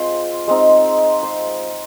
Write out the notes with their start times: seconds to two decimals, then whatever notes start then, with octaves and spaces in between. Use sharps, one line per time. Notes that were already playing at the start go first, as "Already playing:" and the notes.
Already playing: G#3 C4 F4 C5
0.47 G#3 C4 D#4
1.23 C5